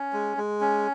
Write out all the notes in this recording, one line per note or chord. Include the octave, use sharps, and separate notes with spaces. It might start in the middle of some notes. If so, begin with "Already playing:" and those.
Already playing: C#4
G#3
G#3
C#4